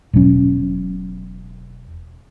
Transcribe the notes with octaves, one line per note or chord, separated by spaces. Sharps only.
E1 B2 F#3 C#4